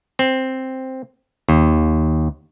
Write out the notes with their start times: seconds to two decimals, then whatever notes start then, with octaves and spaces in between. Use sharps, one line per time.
0.19 C4
1.49 D#2